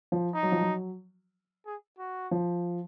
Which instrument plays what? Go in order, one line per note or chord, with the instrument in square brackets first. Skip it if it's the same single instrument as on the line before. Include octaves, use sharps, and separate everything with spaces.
[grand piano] F3
[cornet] D#4
[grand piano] F#3
F3
F#3
[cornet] G#4
F#4
[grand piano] F3